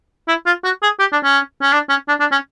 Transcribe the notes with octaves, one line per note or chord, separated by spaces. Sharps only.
E4
F4
F#4
G#4
G4
D4
C#4
C#4
D4
C#4
D4
D4
C#4